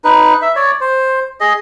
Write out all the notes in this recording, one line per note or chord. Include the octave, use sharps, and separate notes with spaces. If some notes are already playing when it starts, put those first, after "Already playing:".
D#4 B4
E5
C#5 D5
C5
G#4 D#5